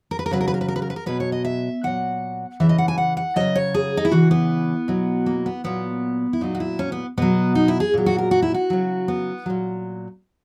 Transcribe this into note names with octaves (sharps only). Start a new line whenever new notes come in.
A#4
B4
A#4
C#3 F#3 B4
A#4
B4
A#4
B4
A#4
B4
A#4
B4
A#4
B2 F#3 B4
C#5
D#5
E5
A#2 F#3 F#5
C#3 E3 E5
D#5
F#5
G#5
F#5
F#5
C#3 F#3 D#5
C#5
G#4
D#4
E4
C#3 E3 F#4
B3
B2 F#3
A#3
B3
A#2 F#3 B3
E4
A#2 F#3 D#4
F#4
E4
C#4
B3
B2 F#3 B3
D#4
E4
G#4
A#2 F#3
F#4
A#4
F#4
E4
F#4
C#3 F#3
B3
A#2 F#3